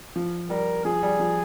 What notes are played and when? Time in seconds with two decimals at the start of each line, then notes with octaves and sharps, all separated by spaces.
0.16 F3
0.50 G3 A#4
0.85 F3 G#4
1.03 G3
1.20 F3